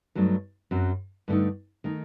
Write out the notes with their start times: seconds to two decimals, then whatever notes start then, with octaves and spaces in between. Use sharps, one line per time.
0.15 G2 F#3 A3 C4 D#4
0.71 F#2 F#3 C4
1.28 G2 D3 A3 D#4
1.84 D#3 A3 D#4